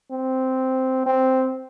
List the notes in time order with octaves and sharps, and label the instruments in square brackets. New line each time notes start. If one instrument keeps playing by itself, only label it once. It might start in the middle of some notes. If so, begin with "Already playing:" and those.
[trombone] C4
C4